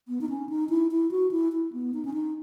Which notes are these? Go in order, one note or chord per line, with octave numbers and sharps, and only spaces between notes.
B3
D#4
C#4
D#4
E4
E4
F#4
E4
E4
B3
D#4
C#4
D#4